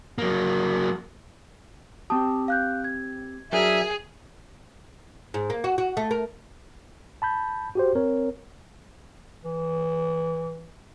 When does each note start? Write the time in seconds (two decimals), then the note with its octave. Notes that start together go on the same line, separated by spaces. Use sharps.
0.18 F#3 A#3
2.10 C4 G4 A5 D#6
2.48 F5 F#6 G6
2.84 G#6
3.53 F#3 D4 G#4 A#4 E5
5.34 G#2
5.50 A#3
5.64 F#4
5.78 F#4
5.97 A3
6.11 A#4
7.22 A5 B5 G6
7.75 F#4 G4 C5
7.95 C4 A#4 C#5
9.44 E3